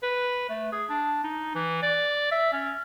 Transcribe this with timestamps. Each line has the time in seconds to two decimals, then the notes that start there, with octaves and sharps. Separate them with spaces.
0.03 B4
0.50 A3
0.72 G#4
0.89 D4
1.24 D#4
1.55 E3
1.82 D5
2.31 E5
2.53 C#4